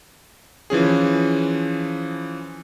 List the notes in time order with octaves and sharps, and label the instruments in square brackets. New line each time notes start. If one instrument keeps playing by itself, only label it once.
[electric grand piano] E3 F3 C#4 G#4